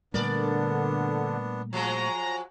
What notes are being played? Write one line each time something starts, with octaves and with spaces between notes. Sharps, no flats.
A#2 D3 G3 A3 B3 D4 A#4 D5
F3 F#3 G#3 A#5